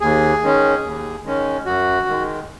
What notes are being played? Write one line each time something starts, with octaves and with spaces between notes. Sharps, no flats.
D#2 G#4
D#3 G#3 C#4
D#2
D#3 G#3 C#4
F#2 F#4
D#3 G#3